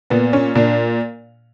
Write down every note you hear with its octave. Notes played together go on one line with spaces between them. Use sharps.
A#2 B3
C#4
A#2 D4